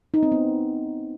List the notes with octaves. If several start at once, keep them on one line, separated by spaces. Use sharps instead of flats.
D#4
C4
B3